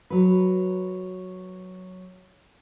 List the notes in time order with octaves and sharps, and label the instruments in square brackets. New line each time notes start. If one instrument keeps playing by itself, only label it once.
[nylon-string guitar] F#3 B4